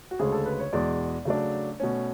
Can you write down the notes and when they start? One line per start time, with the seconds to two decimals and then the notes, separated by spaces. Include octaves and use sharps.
0.11 F#4
0.19 D2 C#3 G#3 G#4
0.32 A4
0.46 B4
0.60 C#5
0.72 E2 B2 G#3 D5
1.25 C#3 F#3 A3 D4
1.80 B2 A3 C#4